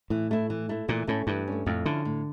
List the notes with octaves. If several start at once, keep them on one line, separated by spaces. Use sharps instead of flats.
A2 E3
A3 E4
E3
A3 E4
A#2 E3
A2 A3 C#4
G2 E3
A3 C#4
F2 A2
D3 F3 C#4 E4
A2